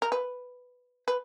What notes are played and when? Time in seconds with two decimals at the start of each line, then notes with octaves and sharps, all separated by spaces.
0.02 A#4
0.12 B4
1.08 B4